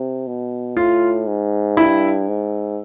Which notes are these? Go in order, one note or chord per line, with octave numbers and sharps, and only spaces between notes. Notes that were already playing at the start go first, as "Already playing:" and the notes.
Already playing: C3
B2
A2 F4
G#2
G2 E4
G#2